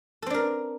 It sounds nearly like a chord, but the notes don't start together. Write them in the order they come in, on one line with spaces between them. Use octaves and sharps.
A4 C4 D4 A#4